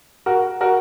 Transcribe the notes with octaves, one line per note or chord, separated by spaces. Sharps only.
F#4 A#4
F#4 A#4